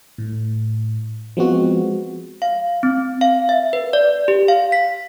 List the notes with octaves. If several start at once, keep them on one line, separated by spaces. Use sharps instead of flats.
A2
F3 G#3 B3 C4 F#4
F5
C4
F5
E5
B4
D5
G4
F5
B6